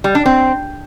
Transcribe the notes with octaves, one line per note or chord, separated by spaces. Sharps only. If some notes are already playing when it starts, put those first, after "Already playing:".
G3
D4
C4